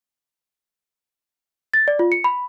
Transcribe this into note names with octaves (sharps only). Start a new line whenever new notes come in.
A6
D5
F4
C#7
B5